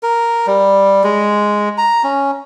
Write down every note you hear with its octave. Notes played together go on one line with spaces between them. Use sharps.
A#4
G3
G#3
A#5
C#4